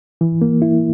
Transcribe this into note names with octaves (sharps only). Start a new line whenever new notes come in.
E3
A#3
E4